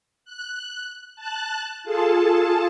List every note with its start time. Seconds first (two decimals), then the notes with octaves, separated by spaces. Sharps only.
0.25 F#6
1.16 A5 F#6
1.84 F4 G#4 A4 A5